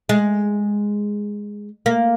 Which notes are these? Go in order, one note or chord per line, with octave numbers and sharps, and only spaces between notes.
G#3
A#3